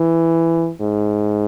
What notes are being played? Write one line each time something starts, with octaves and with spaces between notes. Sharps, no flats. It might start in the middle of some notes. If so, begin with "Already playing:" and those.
Already playing: E3
G#2